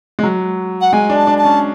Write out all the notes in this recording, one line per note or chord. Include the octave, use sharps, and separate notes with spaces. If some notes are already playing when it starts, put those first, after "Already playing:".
G#3
F#3
F#5
G#3 G#5
D4
A5
D4
A5
C#4